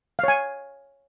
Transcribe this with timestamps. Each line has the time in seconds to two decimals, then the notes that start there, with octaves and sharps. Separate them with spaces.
0.19 F5
0.24 C#5
0.28 G#5